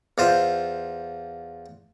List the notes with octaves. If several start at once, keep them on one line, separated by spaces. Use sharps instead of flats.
E2 F4 C5